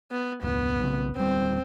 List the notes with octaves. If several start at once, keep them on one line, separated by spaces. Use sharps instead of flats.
B3
E1 C#2 B3
B1 C#3
D1 G3 C4